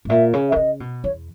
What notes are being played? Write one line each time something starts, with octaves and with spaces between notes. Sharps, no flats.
G#2
A#2 E5
C#3
D#3 E5
C#3 D#5
B2
E2 C#5